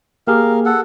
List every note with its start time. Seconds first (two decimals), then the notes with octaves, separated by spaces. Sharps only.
0.27 A#3 G4 G#4 A#4 F5
0.66 A4 F#5